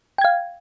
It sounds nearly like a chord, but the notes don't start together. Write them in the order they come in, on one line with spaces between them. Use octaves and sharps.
G5 G#6 F5